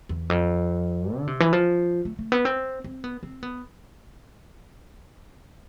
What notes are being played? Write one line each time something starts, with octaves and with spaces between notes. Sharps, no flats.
E2
F2
D3
C3
E3
F3
A3
A3
B3
C4
C4
B3
C4
B3